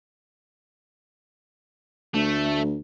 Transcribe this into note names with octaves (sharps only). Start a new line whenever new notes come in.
D2 A3